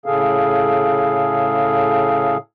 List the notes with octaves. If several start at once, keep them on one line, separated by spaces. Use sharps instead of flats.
A2 C#3 G#4 A4 F5